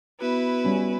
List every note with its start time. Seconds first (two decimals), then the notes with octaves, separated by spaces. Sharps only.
0.21 B3 E4 F#4 B4
0.65 G3 C#4